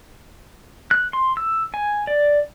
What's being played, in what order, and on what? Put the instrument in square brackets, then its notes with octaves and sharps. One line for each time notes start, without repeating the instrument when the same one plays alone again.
[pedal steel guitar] F#6
C6
E6
G#5
D5